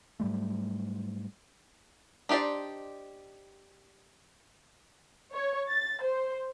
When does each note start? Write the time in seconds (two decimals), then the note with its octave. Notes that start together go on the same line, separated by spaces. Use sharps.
0.20 G#2 F#3 G3 A3
2.29 D4 D#4 G4 C5 D5
5.33 C#5
5.69 A6
6.02 C5